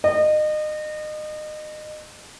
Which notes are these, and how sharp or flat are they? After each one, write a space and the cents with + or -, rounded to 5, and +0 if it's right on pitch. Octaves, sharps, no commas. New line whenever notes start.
D#5 -30